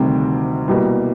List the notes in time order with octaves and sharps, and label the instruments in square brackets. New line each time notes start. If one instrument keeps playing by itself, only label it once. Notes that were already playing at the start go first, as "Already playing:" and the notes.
Already playing: [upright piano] D2 C3 D#3 G3 C4
C2 B2 G3 A#3